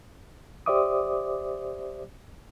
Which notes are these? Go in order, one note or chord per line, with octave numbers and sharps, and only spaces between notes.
G4 C5 D5 E5 D6 D#6